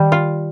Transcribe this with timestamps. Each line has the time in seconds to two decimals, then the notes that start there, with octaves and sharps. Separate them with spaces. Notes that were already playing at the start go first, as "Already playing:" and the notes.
Already playing: D#3 G3
0.12 F4